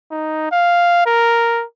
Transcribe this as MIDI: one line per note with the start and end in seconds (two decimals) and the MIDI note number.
0.11 0.51 63
0.52 1.02 77
1.06 1.64 70